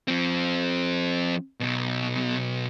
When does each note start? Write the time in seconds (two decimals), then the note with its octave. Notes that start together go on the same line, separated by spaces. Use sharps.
0.08 F3 C4
1.60 B1 B2